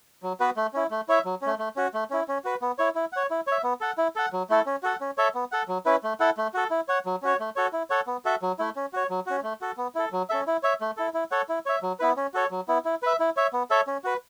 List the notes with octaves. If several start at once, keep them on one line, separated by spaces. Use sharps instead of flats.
F#3
B3 F#4 B4
A3
C#4 E4
A3
E4 C#5 E5
F#3
A3 C#4
A3
C#4 F#4
A3
C#4 E4
C#4
F#4 B4
B3
E4 C#5
E4
C#5 F#5
E4
C#5 E5
B3
A4 F#5
E4
A4 F#5
F#3
A3 E4 A4
C#4
F#4 A4 F#5
C#4
A4 C#5 E5
B3
A4 F#5
F#3
C#4 E4 B4
A3
E4 A4 F#5
A3
F#4 A4
E4
C#5 F#5
F#3
C#4 F#4 C#5
A3
F#4 A4 C#5
E4
A4 C#5 F#5
B3
F#4 A4 E5
F#3
A3 E4
C#4
F#4 C#5
F#3
C#4 F#4
A3
F#4 A4
B3
E4 A4
F#3
C#4 A4 E5
E4
C#5 E5
A3
E4 A4
E4
A4 C#5 F#5
E4
C#5 E5
F#3
B3 E4 B4
C#4
F#4 A4 C#5
F#3
B3 E4
E4
B4 E5
E4
C#5 E5
B3
A4 C#5 E5
C#4
F#4 B4